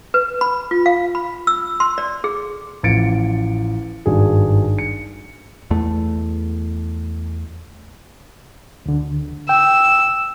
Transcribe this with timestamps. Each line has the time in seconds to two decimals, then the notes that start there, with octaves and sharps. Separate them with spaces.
0.14 B4
0.41 B5
0.71 F4
0.86 F5
1.15 B5
1.47 E6
1.80 C6
1.98 D5
2.24 G#4
2.83 A1 F3 A6 C#7 D7
4.06 G#1 G2 F#4 G#4
4.79 C#7
5.71 E2 A3
8.86 D2 D3
9.49 G5 E6